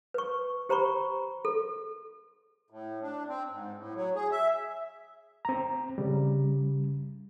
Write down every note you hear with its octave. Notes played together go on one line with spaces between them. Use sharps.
B4 C#6
G4 C5 A#5 B5 C#6
A4
A2
D4
C4
G#2
A2
F#3
G#4
E5
C4 A#5
C#3 G3